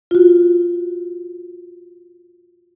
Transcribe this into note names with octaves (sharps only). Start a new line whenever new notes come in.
F4 F#4